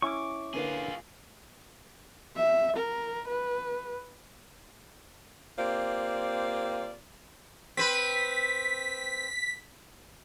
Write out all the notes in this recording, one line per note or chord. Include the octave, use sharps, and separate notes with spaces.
C#4 E4 G#5 C#6 D6
D3 A#3 F4 G#4 B4
E5
A#4
B4
A#3 C4 F4 G4 C5 D5
C4 B4 B6